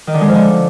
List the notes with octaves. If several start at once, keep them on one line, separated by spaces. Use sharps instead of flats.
D#3
D3
G#3
F3
D3